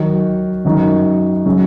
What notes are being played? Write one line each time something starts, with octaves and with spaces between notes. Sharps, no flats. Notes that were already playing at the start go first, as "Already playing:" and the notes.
Already playing: D#3 F#3 D#4 F#4
F#2 D#3 G#3 D#4 F#4
C#3 F#3 C#4 F#4